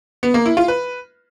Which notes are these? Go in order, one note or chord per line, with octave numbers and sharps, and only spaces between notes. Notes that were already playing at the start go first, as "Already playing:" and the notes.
B3
A#3
E4
F4
B4